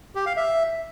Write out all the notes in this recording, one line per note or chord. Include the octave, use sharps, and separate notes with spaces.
G4
F5
E5